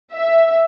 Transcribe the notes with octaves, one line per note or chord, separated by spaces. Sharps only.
E5